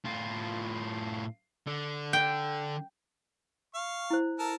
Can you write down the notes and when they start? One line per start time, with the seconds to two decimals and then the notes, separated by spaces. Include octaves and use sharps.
0.05 A2 F4
1.66 D3
2.13 G5
3.75 F5 C#6
4.10 E4 C5
4.39 A4 A#4 A5